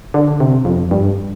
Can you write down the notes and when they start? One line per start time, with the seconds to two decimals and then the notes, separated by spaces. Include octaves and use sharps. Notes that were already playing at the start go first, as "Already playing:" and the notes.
0.14 D3
0.40 C3
0.65 F2
0.91 G2